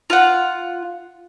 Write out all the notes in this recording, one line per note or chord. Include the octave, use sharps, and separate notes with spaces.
F4 F#5